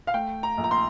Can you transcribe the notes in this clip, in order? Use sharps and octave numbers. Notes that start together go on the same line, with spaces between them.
F5
A3 G5
A#5
A#1
A#5
C6